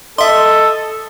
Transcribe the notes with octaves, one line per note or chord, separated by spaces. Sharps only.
A4 D#5 E5 C6